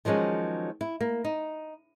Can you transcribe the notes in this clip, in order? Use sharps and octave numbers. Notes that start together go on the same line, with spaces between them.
D#3 F3 F#3 G#3 C#4
E4
A#3
D#4